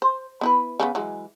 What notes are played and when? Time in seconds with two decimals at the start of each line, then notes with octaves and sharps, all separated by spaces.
0.02 C5
0.41 B3 E4 B4
0.80 C#3 G3 B3
0.95 E3 F#3 G#3